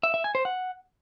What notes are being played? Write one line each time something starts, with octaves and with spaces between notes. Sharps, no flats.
E5
E5
G#5
C5
F#5